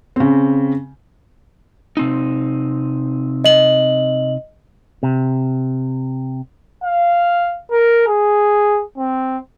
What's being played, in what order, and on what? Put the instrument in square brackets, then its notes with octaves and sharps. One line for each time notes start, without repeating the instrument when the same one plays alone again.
[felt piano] C#3 C4
[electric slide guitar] C3 C4 D#4
[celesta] D#5 F#7
[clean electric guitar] C3
[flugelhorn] F5
A#4
G#4
C4